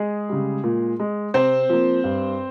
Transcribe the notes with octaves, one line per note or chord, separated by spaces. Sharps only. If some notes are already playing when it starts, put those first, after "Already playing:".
Already playing: G#3 G#4
C#3 G3
A#2
G#3
C3 C4 C5
F3 A#3
G2